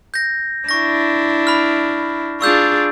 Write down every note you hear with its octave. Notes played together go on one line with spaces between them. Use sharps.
G6 A#6
D4 E4 C#6 A#6
B5 F6
D4 F4 G#4 C#6 E6 G6